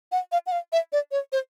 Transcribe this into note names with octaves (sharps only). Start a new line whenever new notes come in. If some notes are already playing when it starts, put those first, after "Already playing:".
F#5
F5
F#5
F5
E5
D5
C#5
C5